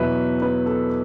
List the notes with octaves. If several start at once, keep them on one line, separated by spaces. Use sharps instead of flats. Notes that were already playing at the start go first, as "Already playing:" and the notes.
Already playing: E2 B2 F#3 B4 E5
B4
A4